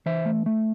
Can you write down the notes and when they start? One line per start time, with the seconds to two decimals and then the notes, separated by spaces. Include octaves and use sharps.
0.06 E3 C5 E5
0.25 A3
0.46 A3